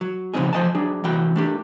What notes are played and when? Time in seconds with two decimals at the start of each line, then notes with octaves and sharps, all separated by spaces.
0.01 F#3
0.34 C#3 F3 F#3 C4 D#4 G#4
0.53 F3 C5 D5 D#5 G#5 A5
0.75 F#3 D4 G#4
1.04 C2 A#2 E3 F#4 G5 B5
1.36 A3 D4 G4